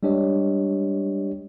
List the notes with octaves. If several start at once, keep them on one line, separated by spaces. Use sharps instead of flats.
G3 G#3 D4 G4 C#5 D#5